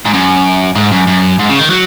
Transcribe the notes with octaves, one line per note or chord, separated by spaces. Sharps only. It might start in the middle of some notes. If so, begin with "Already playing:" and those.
G#2
F#2
G#2
F#2
F#2
G#2
C#3
D#3
F#3